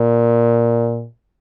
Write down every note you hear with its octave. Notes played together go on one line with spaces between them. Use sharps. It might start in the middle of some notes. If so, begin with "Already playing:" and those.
Already playing: A#2